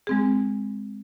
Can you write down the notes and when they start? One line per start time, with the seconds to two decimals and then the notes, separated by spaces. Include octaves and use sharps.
0.07 G#3 C4 G#4